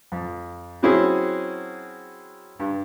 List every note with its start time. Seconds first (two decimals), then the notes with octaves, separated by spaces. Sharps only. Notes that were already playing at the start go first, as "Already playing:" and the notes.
0.12 F2
0.82 F#3 C4 C#4 E4 F#4 G#4
2.60 G2